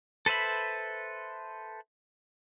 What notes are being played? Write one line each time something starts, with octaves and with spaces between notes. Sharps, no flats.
A4 B4 C5 E5 B5